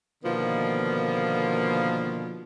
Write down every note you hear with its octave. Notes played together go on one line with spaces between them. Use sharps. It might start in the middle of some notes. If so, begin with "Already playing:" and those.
B2 D3 D#3 F3 A#3 B3